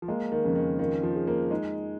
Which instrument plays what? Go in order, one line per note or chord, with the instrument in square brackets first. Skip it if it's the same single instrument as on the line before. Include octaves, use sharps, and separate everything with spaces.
[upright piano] F3
[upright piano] G#3 [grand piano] A#3
[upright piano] D#3
[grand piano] F2 [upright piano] C#3
[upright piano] D#3
[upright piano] D#3 [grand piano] F4
[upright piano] F3
[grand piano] G#4
[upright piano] A#3
[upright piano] G#3 [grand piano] D#4